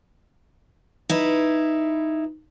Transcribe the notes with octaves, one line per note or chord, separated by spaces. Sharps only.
D#4 E4 B4